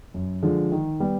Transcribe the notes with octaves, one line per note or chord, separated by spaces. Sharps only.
F#2
D3 F3 G#3
D#3
G3 B3